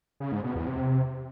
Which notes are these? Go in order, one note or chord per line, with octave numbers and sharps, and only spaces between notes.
C#3
G#2
B2
E2
C3